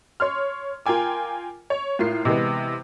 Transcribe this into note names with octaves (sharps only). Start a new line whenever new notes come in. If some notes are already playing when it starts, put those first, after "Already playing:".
C#5 C6 F6
F4 A#4 G5 G#5 D6
C#5
A2 F4 A#4 C7
C3 E3 G#3 B3